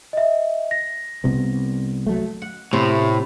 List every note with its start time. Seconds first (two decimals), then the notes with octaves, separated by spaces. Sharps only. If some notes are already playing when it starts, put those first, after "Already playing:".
0.13 D#5 E5
0.71 A#6
1.24 C2 C3 B3
2.07 F#3 A3
2.42 F#5
2.73 A2 C3